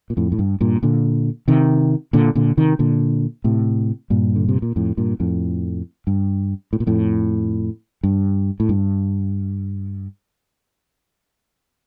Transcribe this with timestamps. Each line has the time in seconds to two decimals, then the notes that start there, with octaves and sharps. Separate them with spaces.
0.10 A#2
0.17 F2 A2
0.32 A2
0.39 G2
0.61 G2 A#2
0.83 A#2 D3
1.48 C3 D#3
2.13 A#2 D3
2.35 A#2 D3
2.57 C3 D#3
2.79 A#2 D3
3.44 A2 C3
4.10 G2 A#2
4.35 D3
4.49 C3
4.62 A#2
4.76 F2 A2
4.97 G2 A#2
5.20 F2 A2
6.07 G2
6.73 A2
6.80 A#2
6.87 F2 A2
8.03 G2
8.60 A2
8.69 G2